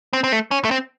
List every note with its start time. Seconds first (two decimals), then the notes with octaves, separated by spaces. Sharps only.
0.13 C4
0.24 C4
0.32 A3
0.51 C#4
0.65 A3
0.71 C4